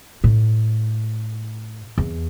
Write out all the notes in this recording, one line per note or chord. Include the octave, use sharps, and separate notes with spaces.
A2
E2